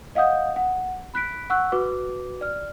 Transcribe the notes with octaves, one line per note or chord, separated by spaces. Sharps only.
D#5 F5 F#5 D#6 G6
F#5
B5 F#6 B6 D7
F#5 C#6 E6 F#6
F#4 B4 D6
D5 F6